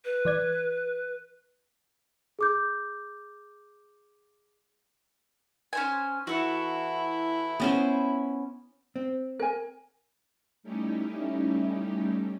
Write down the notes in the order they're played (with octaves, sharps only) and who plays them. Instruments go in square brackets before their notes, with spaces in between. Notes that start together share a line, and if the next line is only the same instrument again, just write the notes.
[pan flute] B4
[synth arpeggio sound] E3 D5 G#6
[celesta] G#4 D6 G6
[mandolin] C#4 C5 G#5
[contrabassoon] E3 [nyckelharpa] E4 [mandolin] F#4 A4
[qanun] B3 C#4 C5
[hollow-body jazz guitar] C4
[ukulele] A#4 G#5
[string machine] G3 A3 C#4 D#4 E4 G4